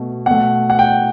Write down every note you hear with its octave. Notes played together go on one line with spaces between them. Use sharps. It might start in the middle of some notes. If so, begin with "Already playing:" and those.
Already playing: B2 A3
B2 A3 F#5
F#5
G5